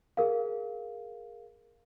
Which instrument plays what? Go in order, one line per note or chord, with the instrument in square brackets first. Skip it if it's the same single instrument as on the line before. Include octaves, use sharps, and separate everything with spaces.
[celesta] G#4 A#4 F5